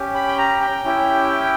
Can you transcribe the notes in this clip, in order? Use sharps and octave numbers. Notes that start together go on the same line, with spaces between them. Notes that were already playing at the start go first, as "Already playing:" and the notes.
Already playing: C#4 G4
B5
G5
A#5
G5
C#4 E4 G4